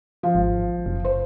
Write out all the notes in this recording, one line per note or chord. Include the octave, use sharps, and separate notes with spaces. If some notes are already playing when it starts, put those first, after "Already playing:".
F3
G#1
F#1
C5